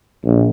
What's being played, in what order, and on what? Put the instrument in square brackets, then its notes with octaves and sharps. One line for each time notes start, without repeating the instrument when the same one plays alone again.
[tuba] A#1